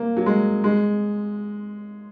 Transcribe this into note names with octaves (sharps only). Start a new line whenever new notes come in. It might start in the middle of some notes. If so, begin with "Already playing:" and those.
Already playing: A#3
F#3
G#3
G#3